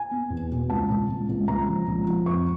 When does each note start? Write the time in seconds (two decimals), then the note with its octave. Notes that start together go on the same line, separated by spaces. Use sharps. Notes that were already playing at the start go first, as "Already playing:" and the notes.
Already playing: G#5
0.11 B3
0.30 E2
0.50 B2
0.70 C#2 A5
0.89 C#2
1.08 C#2
1.29 C#2
1.48 C#2 A#5
1.67 F3
1.87 C#2
2.07 F3
2.26 F2 C#6